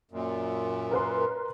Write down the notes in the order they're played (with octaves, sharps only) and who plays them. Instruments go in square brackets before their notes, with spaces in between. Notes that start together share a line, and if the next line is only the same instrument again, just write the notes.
[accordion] F#2 A#2
[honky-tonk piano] A#4 B4 C6